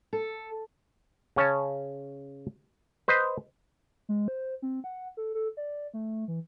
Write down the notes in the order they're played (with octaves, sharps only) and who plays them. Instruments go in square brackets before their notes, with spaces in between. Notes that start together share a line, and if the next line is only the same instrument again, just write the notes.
[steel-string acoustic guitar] A4
[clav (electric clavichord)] C#3 C#4 C#5 A5
B4 C5 D#5
[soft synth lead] G#3
C5
C4
F#5
A4
A4
D5
A3
E3